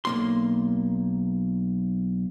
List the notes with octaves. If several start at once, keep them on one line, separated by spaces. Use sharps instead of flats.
B1 A#3 C6